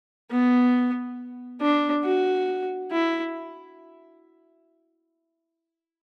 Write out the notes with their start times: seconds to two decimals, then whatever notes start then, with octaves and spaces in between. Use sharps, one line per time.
0.31 B3
1.61 D4
2.04 F#4
2.91 E4